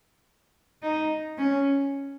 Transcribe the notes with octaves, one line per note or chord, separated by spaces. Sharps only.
D#4
C#4